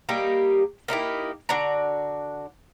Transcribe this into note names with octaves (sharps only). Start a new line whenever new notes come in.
G3 A#3 D#4 G4
A#3 D#4 E4 G4
D3 D4 F#4 A#5